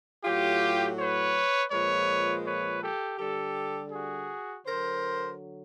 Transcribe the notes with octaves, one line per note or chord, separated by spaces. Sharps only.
A2 F#3 F4 G4
B4 C#5
A#2 F3 G#3 B4 C#5
B4 C#5
G4 A4
D3 G3 G4 A4
F#4 G#4
D3 F#3 A#4 C5